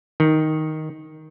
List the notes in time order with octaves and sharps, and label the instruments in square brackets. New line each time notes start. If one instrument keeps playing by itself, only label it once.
[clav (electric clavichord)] D#3